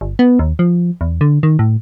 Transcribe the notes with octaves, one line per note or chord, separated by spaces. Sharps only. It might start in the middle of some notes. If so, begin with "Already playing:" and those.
G1
B3
D#2
F3
E2
D3
D#3
A2